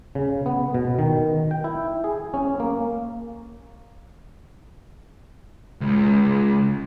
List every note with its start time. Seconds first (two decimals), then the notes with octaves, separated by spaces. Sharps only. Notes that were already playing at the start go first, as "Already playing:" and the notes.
0.15 C#3
0.46 B3
0.74 B2
0.99 D#3
1.51 G5
1.64 E4
2.04 G#4
2.34 C#4
2.60 A#3
5.81 C#2